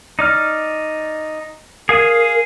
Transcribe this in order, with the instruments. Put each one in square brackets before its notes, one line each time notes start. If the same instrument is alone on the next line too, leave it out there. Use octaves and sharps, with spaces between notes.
[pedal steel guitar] D#4 D5 F6
[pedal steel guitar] G#4 F5 G#5 [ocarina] A#4